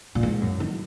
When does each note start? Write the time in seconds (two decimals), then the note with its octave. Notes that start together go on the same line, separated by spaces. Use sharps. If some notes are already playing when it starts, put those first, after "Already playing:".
0.15 A#2
0.23 G#2
0.41 F#2
0.60 D#3